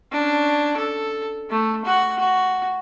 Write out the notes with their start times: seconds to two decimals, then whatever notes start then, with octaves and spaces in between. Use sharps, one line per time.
0.12 C#4 D4
0.77 A4
1.50 A3
1.85 F#4 F#5
2.18 F#4